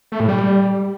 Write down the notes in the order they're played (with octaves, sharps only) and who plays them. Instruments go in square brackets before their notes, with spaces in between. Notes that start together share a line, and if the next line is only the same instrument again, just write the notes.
[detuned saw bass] A3
A2
G3